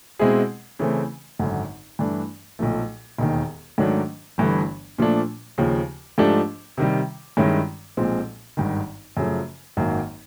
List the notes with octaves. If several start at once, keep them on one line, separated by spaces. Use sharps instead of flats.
B2 G#3 C4 E4 G#4
C#3 E3 A3 C4
G#1 F#2 D3
G2 E3 A3 D4
B1 A#2 F3 A3
E1 D#2 D#3
G#2 D#3 F#3 A3 D4
G1 G2 E3 A3
A#2 F3 A3 D4
D#2 C#3 F3
G#2 F3 A3 D4 G4
C3 D#3 G3
G2 D#3 G#3 C#4 E4
B1 A#2 F3 G#3 C4
G#1 G2 D#3
F#2 C#3 F3 A3
G#1 F#2 D#3 F#3 A#3